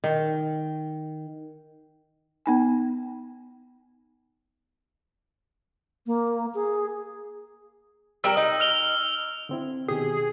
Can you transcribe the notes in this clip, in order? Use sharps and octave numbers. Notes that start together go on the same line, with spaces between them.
D#3
B3 D#4 G#5
A#3
G#4
G3 G4 A#4 E6
D#4
F6 F7 G7
D3 C4 E4
B2 D#3 G4 G#4